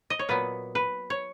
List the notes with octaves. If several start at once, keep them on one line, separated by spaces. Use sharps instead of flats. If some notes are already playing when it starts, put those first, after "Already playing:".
D#5
C#5
A#2 F#3 B3 B4
B4
C#5